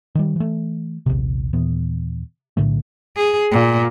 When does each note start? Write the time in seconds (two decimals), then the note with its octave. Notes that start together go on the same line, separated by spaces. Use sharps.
0.15 D#3 G3
0.36 E3 A3
1.06 A#1 D#2 C3
1.53 D#2 A#2 E3 B3
2.57 B1 A2 D3 A3
3.16 G#4
3.52 A#2